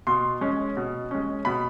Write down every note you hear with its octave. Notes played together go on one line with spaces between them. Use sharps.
B2 C6
G#3 C#4
B2
G#3 C#4
B2 B5